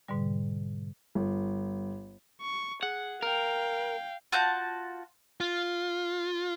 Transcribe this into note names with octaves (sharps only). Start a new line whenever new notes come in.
G#2 B2 D3 G3
G1
C#6
G#4 F#5
A#4 F5 G5
F4 F#4 A5 G6
F4